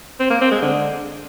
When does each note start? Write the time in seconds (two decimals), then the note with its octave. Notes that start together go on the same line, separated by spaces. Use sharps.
0.20 C4
0.30 A#3
0.41 C4
0.51 G#3
0.62 D3